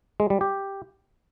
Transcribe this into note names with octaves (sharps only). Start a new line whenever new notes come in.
G#3
G3
G4